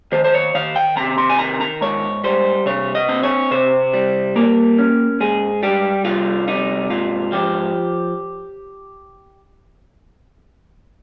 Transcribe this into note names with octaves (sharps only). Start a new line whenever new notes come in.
D#3 C5
C5
C#5
D#3 F5
G5
C3 A#5
C6
G#5
D#3 A#5
A#5
G#2 C#5
G3 C5
C3 C#5
D#5
C4
C#5
C3 C5
G3
A#3 A#4
C#4
G#2 G#4
G3 G4
C2 F4
C3 D#4
G#2 F4
F3 G4